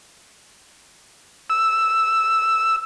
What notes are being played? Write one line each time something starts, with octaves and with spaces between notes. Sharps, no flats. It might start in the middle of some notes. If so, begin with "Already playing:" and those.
E6